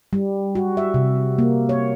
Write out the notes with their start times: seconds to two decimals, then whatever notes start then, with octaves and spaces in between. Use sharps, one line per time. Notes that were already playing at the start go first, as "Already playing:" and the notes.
0.13 G3
0.55 F#4
0.77 E5
0.94 C3
1.39 A#3
1.69 C#5